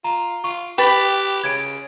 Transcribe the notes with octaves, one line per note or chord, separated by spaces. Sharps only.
F4 A#5
F4 C#6
G4 B4 G5 A6 B6
C#3 G#6 D7